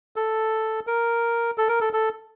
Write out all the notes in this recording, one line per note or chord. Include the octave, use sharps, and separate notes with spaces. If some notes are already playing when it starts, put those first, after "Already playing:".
A4
A#4
A4
A#4
A4
A4